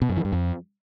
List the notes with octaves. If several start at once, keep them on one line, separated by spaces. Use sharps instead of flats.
B2
F#2
E3
G2
F2